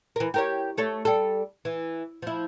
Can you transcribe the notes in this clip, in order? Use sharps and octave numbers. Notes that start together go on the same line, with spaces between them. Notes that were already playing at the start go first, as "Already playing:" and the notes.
E3 A#4
G4 A#4 C#5
A3 A4 C#5
G3 A4
E3
F3 E4